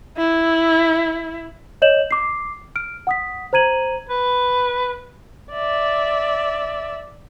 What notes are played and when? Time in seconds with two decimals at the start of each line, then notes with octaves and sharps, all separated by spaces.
0.18 E4
1.82 C#5 D#5 G6 E7 F#7
2.11 D6 C7
2.76 F6 D7
3.07 F#5 D#6 B6
3.53 C5 A#5 G#6 D#7 F#7
4.10 B4
5.52 D5 E5